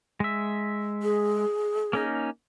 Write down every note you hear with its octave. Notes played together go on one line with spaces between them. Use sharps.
G#3 E5
G#4
A#3 C#4 D#4